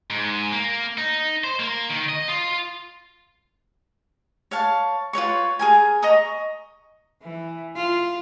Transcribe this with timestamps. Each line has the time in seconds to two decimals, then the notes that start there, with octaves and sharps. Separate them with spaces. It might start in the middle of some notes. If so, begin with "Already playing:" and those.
0.10 G#2
0.52 A#3
0.98 D#4
1.44 C5
1.60 A#3
1.89 D#3
2.09 D#5
2.28 F4
4.51 C#5 F5 A5
5.13 F4 B4 C#5 C#6
5.59 G#4 A#4 G#5
6.02 D#5 A#5 C#6 D#6
7.23 E3
7.76 F4